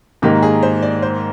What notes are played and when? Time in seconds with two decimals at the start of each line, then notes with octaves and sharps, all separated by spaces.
0.22 G#2 D#3 A#3 G4
0.43 G#4
0.63 C5
0.83 D5
1.02 C5